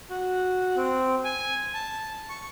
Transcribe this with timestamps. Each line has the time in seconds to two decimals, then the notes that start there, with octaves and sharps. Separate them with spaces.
0.10 F#4
0.76 C4
1.24 G#5
1.74 A5
2.29 C#6